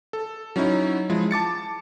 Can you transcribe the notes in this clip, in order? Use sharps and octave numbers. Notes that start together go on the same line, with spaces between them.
A4
F#3 C#4 D#4 E4
F3 G#3 E4
A5 D6 A6 C#7